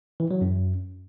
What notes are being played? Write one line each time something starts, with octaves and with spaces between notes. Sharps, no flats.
E3
F#3
F#2